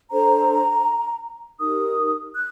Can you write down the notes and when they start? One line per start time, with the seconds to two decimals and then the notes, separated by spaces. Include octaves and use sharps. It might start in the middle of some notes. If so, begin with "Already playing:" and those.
0.11 D4 A4 C5 A#5
1.59 D#4 G4 A#4 D#6
2.34 F#6